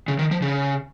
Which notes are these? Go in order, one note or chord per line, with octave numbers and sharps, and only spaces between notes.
C#3
D#3
F3
C#3